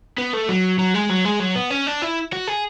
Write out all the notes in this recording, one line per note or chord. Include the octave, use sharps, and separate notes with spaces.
B3
A3
F#3
F#3
G#3
F#3
G#3
F#3
B3
C#4
D4
E4
F#4
G#4